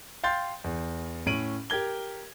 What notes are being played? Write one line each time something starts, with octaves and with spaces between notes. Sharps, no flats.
F5 G5 C6 G6 A6
E2
A2 C#4 D7 D#7 F#7
G4 A#4 G#6 G7